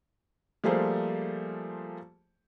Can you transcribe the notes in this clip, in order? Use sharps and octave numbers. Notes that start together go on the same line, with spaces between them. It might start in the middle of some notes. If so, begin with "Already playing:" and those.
F3 G3 A3 A#3 G#4 C5